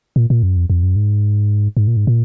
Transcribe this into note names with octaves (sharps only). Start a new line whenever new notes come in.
A#2
A#2
F#2
F2
F2
F#2
G#2
G#2
A#2
G#2
A#2